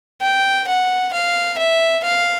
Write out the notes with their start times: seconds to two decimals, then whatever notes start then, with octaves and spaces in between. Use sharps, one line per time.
0.22 G5
0.68 F#5
1.13 F5
1.58 E5
2.04 F5